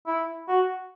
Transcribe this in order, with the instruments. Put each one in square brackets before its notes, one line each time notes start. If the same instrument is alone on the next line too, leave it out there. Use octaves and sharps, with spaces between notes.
[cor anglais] E4
F#4